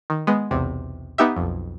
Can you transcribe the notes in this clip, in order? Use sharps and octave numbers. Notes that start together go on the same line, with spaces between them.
D#3
G#3 B3
B1 E2 C3
B3 D#4 G4 E5
B1 F2